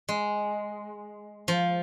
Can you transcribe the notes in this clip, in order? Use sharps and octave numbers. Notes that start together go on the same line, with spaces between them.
G#3
F3